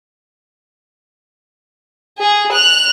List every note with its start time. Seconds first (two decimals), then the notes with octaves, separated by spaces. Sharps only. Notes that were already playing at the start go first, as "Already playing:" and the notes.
2.18 G#4
2.52 F#6 F7